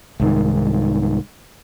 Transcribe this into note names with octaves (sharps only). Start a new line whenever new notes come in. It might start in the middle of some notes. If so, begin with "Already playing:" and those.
C2 G#2 D#3